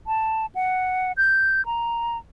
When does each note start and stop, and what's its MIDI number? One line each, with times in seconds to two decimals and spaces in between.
0.07 0.46 81
0.55 1.12 78
1.17 1.65 91
1.66 2.17 82